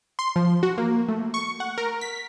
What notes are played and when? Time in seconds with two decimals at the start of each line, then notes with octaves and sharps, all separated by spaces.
0.19 C6
0.36 F3
0.63 F#4
0.78 A#3
1.09 A3
1.34 C#6
1.60 F#5
1.78 A#4
2.01 B6